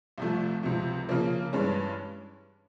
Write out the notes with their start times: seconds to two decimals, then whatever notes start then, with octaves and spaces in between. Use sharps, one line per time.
0.18 C2 C3 F3 A3
0.62 C#2 C3 F3
1.08 C#3 F3 A#3 C#4
1.53 G2 E3 G#3 C#4